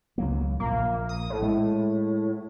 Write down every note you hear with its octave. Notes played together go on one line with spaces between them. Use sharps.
C#2 F#3 A#3
A#1 A#2 A#3
D#6
A2
G#3